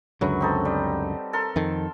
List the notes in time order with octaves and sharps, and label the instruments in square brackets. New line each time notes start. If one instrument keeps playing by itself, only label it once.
[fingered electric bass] C#2 F#2 D3 [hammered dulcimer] F#3 B4
[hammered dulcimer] C4 D#4 A4
G3
A4 A#4 C6
[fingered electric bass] F2 D#3